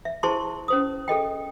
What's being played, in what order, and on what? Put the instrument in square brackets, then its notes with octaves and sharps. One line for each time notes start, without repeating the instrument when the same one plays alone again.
[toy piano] E5
E4 G#4 C5 A5 C6 C#6
C#4 C5 D#6
G#4 A4 D#5 G5